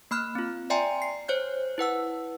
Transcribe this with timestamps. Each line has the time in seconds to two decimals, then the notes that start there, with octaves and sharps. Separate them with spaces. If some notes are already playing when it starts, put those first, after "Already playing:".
0.11 A#3 B5 F6 F#6
0.35 C4 F4
0.70 D5 E5 G5 G#5 A#5 C6
1.02 C7
1.28 C5 C#5 F#6 G6
1.78 E4 B4 F#5 E6